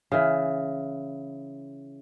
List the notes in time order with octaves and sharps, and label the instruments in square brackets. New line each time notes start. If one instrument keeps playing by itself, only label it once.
[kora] C#3 E3